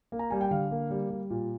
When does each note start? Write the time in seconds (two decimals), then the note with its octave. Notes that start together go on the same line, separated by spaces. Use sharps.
0.12 A#3
0.19 A#5
0.30 G3 G#5
0.41 G5
0.51 D3 F5
0.71 A#3
0.90 G3
1.10 G3
1.30 A#2